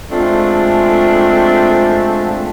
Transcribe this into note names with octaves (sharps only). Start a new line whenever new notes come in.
G#3 A3 C4 D4 F4